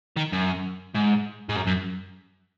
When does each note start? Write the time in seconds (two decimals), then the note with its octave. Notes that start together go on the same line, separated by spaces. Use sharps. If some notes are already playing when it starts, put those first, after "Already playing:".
0.17 D#3
0.33 F#2
0.94 G#2
1.49 G#2
1.56 F#2
1.67 F#2